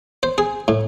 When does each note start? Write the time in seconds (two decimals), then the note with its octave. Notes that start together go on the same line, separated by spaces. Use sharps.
0.23 C5
0.38 G#4
0.68 A2